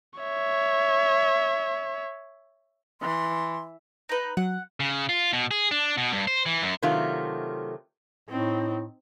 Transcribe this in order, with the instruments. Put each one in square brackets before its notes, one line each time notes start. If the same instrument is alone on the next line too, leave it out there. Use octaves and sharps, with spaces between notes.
[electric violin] C#5 E5
[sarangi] E3 [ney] C6
[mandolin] D#4 B4
[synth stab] F#3 [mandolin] F#5
[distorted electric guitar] C#3
F4
B2
G#4
D4
B2
G2
C5
E3
F#2
[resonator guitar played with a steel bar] C3 D#3 F#3 A3 F4
[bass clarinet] A2 [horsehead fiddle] C4 D#4